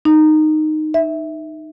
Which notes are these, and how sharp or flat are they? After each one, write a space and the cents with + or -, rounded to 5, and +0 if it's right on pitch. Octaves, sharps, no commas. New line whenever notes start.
D#4 -10
E5 -10